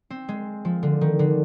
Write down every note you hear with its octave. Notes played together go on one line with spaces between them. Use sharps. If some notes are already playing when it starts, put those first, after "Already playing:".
C4
G#3
F3
D3
D#3
D3